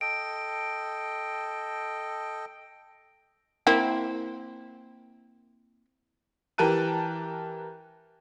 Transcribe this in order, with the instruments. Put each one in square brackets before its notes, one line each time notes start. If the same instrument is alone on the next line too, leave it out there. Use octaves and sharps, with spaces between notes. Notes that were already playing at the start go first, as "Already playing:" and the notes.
[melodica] A4 D#5 G5 [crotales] D7
[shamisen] A#3 C4 E4
[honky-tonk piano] E3 G4 A#4 A5 F#6 D#7